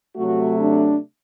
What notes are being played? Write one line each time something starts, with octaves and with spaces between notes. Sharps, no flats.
C3 F#3 A3 F#4
D4